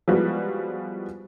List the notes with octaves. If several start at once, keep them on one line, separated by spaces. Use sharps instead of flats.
F3 G3 G#3 B3 E4 F#4